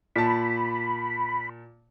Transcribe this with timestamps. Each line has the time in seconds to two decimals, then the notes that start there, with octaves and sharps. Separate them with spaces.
0.16 A#2 A5 B5